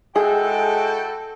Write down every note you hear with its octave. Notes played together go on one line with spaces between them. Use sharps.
G#3 E4 F#4 G#4 A4 G5